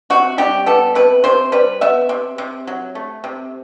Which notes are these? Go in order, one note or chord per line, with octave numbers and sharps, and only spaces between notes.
C3 F#4
G3 G4
B3 A4
C3 B4
C3 C5
G3 B4
B3 E5
C3
C3
F#3
A3
C3